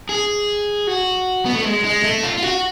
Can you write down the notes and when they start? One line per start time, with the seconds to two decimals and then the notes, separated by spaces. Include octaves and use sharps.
0.09 G#4
0.87 F#4
1.46 B3
1.55 A3
1.65 G#3
1.84 G#3
2.04 A3
2.23 F4
2.38 F4
2.42 F#4